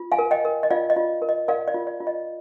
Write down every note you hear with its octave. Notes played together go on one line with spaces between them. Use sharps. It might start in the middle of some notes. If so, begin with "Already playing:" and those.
Already playing: F4
F5 G#5
A#4
D#5 G5
A#4
D#5
F4 D5 F5
D#5
F4
A#4
D#5
A#4 D5 F5
D5
F4
D5
F4
D#5